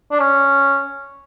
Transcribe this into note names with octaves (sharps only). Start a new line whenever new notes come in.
D4
C#4